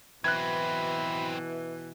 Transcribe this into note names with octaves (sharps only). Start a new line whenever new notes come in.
B2 E3 F#3 C4 B5 F#6 G#6